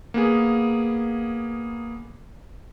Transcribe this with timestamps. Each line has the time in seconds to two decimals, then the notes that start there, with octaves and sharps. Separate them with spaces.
0.14 A#3 B3 G#4